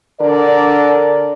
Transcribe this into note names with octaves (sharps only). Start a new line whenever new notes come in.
D3 D4 A#4 D5